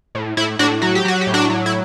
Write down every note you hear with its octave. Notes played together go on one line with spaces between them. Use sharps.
A2
A2 E4
A2 D4 F#4
F#3 F#4
G4
F#3 F#4
G4
A2
D4 F#4
F#3
E4